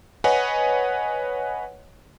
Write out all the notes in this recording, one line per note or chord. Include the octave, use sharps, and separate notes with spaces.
B4 C#5 D#5 F#5 G#5